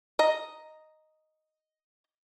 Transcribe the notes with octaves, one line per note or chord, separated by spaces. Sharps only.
D#5 A#5